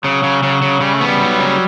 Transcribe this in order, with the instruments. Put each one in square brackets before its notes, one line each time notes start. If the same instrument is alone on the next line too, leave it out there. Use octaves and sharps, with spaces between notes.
[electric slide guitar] C#3 [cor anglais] F#3
[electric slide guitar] C#3
C#3
C#3
[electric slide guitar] C#3 [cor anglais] G3
[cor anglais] A3
[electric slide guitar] B3
[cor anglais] G3
[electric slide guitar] F#3
C#3